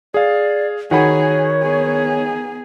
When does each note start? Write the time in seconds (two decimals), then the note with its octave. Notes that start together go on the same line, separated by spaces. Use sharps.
0.14 G#4 D5 F5
0.91 D#3 F#4 G#4 C#5 F#5 B5
1.63 B3 G#4